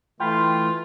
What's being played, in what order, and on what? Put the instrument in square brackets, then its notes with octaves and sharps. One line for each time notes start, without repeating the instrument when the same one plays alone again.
[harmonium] E3 A3 [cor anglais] F4 [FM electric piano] G5 B5 C6